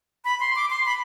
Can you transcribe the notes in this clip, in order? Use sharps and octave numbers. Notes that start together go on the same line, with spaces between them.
B5
C6
D6
C6
B5